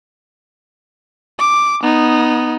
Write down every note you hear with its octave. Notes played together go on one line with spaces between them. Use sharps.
D6
B3 D#4